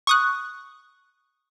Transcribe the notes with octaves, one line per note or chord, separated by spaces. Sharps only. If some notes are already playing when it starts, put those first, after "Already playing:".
C#6 D#6 F#6